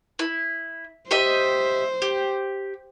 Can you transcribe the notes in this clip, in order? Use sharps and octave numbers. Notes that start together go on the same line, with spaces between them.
E4
G4 C5 D#5 E5
G4